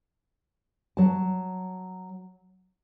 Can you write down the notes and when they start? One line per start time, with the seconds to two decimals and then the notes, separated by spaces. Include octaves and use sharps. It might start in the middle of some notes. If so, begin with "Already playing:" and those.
0.97 F#3 A5